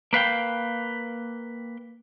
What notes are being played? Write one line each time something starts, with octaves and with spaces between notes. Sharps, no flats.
A#3 B4 F5 G5